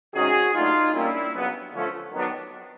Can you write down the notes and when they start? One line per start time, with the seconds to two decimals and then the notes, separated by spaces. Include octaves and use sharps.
0.14 C3 D#3 G#3 C#4 F#4 G#4
0.54 A#2 F#3 A3 D4 D#4 F4
0.94 A#2 G3 A#3 C#4 D4 E4
1.34 C#3 F#3 B3
1.73 D3 F3 A3 C#4
2.13 D#3 F#3 B3 D4